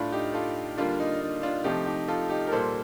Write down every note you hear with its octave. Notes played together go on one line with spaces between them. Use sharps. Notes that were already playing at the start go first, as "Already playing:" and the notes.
Already playing: A2 A3 D4 F4
D#4 G4
F4 A4
D3 G3 A#3 D4 F4
D#4
D#4
D4 F4
C3 F3 A3 D#4 G4
D#4 G4
F4 A4
D#4 G4
A#4
A#2 G3 A#3 A4 C5